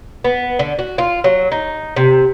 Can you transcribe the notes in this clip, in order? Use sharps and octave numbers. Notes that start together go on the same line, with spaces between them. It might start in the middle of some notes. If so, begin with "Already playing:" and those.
B3
D3
F#4
F4
F#3
D#4
C3